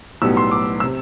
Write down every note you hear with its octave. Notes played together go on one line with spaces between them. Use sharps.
B1 A2 G3 B3 E6
C6
D6
C3 E6